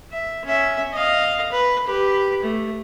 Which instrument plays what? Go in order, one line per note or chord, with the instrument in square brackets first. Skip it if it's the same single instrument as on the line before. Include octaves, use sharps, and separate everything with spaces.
[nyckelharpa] E5
C#4 E5
D#5 F5
B4
G4 B4
A3